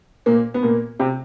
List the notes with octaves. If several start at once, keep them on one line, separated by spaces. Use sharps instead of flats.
A#2 A#3
B3
A#2 A#3
C3 C4